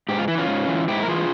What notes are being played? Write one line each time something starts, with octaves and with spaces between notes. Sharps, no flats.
G#2 G4
F4
E3 E4
C#4 F4
G#2
E3
G#2 E4 G4
A#4
E3 F4 G#4